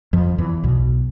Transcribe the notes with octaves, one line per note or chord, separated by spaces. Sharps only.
F2 F3
E2 E3
B1 B2